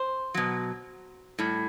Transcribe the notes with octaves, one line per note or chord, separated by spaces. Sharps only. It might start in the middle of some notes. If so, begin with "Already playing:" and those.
Already playing: C5
B2 F#3
A2 G3